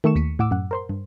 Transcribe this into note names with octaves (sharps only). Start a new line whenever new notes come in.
D#3 A3 A4 C#6 E7
D#2 B6 C#7 D#7
A2 F#5 D6 E6
F#2 F#5
A#4 C5 C6
G2